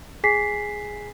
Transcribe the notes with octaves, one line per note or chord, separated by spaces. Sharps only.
G#4 G#5 B6 C7